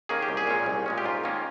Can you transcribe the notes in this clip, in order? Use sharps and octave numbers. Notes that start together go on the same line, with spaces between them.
D#3 A#3 C#4 G#4
G4
C2
G#4
A#2 G#3 C#4
C2
A#2 G#3 C#4
G4
G#2 F4
D#3 A#3 C#4